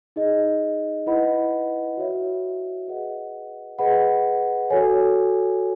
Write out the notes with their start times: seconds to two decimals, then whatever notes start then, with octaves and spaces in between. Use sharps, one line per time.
0.16 D#4 G#4 D#5
1.07 E4 B4 D#5 F#5 B5
1.97 F#4 C#5 E5
2.88 G#4 B4 D#5 F#5
3.79 G#4 B4 D#5 F#5 B5
4.70 F#4 A4 C#5 G#5